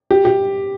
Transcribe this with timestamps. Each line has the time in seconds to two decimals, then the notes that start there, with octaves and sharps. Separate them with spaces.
0.11 G4
0.25 G4